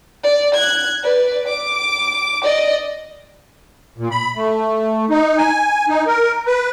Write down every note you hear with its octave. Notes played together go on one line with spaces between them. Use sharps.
D5
F#6 G#6
B4 D5
D6
D5 D#5
A#2
B5
A3
D#4
G#5
D#4
A#4
B4